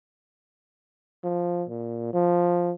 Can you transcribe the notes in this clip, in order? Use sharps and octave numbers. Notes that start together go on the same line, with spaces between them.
F3
A#2
F3